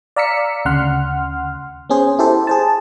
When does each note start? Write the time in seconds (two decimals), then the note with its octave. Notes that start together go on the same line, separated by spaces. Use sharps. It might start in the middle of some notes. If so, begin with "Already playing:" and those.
0.16 D5 F5 A#5 E6 B6 C#7
0.65 D2 C#3 F#5 C6 F6
1.90 B3 C#4 G#4 C5
2.19 E4 G4 A4 C5
2.47 G#4 C5 A5